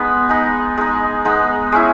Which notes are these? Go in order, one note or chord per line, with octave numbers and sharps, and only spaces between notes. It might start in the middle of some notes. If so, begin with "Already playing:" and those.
Already playing: G#3 B3 D#4 G#5 B5
G#3 D#4
G#3 D#4
G#3 B3 D#4
G#3 C#4 E4